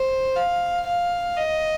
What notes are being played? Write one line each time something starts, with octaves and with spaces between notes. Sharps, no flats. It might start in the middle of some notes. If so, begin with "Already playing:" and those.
Already playing: C5
F5
F5
D#5